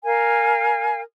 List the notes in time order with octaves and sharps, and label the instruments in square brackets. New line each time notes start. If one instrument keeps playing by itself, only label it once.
[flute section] A#4 F5 G#5